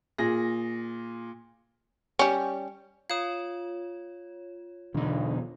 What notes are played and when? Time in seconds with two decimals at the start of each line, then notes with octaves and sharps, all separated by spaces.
0.18 A#2 G#4 A#6
2.19 G3 C#4
3.10 F4 C#5 F5 D#6
4.94 B1 E2 D3 D#4